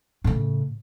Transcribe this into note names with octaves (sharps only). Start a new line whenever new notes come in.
A2 C#3